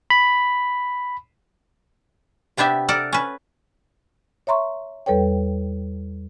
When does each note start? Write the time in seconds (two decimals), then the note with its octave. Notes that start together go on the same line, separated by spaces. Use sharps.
0.10 B5
2.57 C3 B3 D4 G4 E5
2.89 A4 A#4 D5 F#5
3.13 C#4 B4
4.47 C#5 E5 A#5 C6 C#6
5.06 E2 G3 A4 B4 C#5 G5